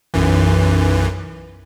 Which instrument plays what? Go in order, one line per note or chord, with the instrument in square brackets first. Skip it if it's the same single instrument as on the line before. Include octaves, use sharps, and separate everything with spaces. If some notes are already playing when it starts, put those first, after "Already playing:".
[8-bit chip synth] B1 F#2 E3